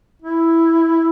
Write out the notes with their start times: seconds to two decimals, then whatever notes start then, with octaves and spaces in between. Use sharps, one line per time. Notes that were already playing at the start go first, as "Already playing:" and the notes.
0.22 E4